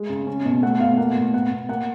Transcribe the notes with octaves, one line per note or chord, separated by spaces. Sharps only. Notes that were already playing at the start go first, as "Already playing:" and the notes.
Already playing: G#3
C#3
C#4
B2
A3 F#5
B2 F5
A#3 F#5
A2
B3 F#5
B2
A#3 F#5